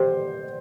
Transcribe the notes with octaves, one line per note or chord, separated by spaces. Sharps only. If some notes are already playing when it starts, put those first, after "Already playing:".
Already playing: G4 C5